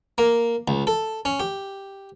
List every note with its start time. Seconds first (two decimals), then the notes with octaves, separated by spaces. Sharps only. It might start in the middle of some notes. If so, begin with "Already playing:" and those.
0.18 A#3
0.68 C#2
0.87 A4
1.25 C#4
1.40 G4